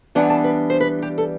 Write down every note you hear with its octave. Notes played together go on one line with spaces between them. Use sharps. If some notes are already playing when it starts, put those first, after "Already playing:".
E3 G3 B3 D4 F#5
A5
B4
C5
B4
G4
A4